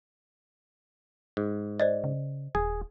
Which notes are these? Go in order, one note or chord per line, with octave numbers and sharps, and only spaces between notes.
G#2
C5 D5 D#5
C#3
D#1 G#4